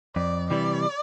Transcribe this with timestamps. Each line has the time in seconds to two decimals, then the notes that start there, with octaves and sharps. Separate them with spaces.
0.16 F2 D5
0.50 C3 E3 G3 D5